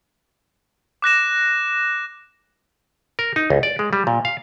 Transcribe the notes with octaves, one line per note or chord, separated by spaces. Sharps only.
D6 F#6 A#6 E7
A#4
D#4
C#2
D5
G#3
G3
A#2
F5